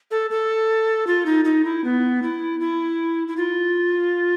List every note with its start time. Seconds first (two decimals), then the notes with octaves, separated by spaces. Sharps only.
0.11 A4
0.30 A4
1.07 F4
1.26 D#4
1.45 D#4
1.64 E4
1.84 B3
2.22 E4
2.60 E4
3.28 E4
3.37 F4